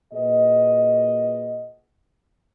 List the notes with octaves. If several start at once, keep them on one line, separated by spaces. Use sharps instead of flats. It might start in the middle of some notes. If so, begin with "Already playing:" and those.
A#2 F#4 G#4 B4 D#5